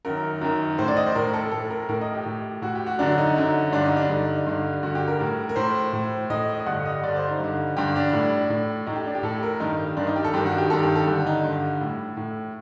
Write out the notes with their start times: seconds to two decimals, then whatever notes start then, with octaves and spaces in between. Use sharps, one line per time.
0.05 F#2 D#3 A#4
0.41 F#2 D#3
0.78 A2 C5
0.88 D5
0.97 D#5
1.06 C5
1.15 A2 A#4
1.34 A4
1.52 A2 A4
1.70 A#4
1.89 A2 A#4
2.01 D#5
2.14 G4
2.26 A2
2.62 A2 F#4
2.75 G4
2.86 F#4
2.99 F#2 D3 D4
3.18 D#4
3.36 F#2 D3
3.72 G2 D3 D4
3.85 D#4
3.97 D4
4.09 G2 D3 D#4
4.47 G2 D3
4.83 G2 D3 F#4
4.95 G4
5.08 A#4
5.20 A2
5.49 A#4
5.56 A2 C5
5.93 A2
6.30 A2 D#5
6.60 D#5
6.66 G2 D3 F#5
6.86 D#5
7.03 G2 D3 D5
7.16 C5
7.28 D#4
7.40 G2 D3
7.77 G2 D3 G4
7.96 D4
8.13 A2
8.50 A2
8.86 A2 D#4
8.96 G4
9.06 D4
9.15 G4
9.23 A2 A4
9.43 A#4
9.60 G2 D#3 D#4
9.97 G2 D#3 D4
10.07 D#4
10.16 G4
10.25 A4
10.34 G2 D#3 G4
10.46 F#4
10.58 G4
10.70 G2 D#3 A4
10.83 G4
10.96 A4
11.07 G2 D3 G4
11.27 D#4
11.44 G2 D3
11.81 A2
12.17 A2